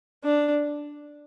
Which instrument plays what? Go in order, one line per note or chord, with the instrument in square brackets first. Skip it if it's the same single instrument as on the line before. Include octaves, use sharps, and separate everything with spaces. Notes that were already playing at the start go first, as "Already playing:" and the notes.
[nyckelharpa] D4